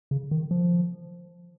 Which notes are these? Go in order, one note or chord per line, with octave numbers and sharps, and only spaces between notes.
C#3
D#3
F3